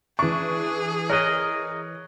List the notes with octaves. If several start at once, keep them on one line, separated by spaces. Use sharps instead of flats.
E3 D4 G#4 C#6
A#4 C#5 D#5 F#6